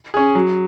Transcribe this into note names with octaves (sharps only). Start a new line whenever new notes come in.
C#4 G#4
F#3